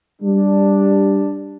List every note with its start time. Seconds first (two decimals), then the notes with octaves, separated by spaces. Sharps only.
0.22 G3 D4